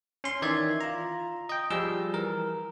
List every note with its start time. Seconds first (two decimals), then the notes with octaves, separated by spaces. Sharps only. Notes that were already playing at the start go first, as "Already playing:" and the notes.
0.24 C#4 C6
0.42 D#3 E3 D5 E5 G#6
0.81 F4 A#5
1.49 D#5 G5
1.71 F3 G3 G#4 E6
2.14 E3 A#4